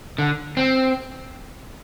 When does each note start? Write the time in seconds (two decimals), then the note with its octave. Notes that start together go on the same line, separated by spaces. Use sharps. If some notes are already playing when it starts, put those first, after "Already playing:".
0.18 D3
0.57 C4